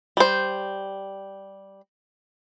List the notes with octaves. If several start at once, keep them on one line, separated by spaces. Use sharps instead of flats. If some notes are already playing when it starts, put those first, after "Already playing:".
G3 C5